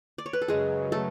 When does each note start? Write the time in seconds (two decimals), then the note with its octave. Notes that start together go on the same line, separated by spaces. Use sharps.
0.18 D5
0.26 C#5
0.33 B4
0.42 A4
0.48 F#2 C#3 F#3 G#3 G#4
0.92 A3 A4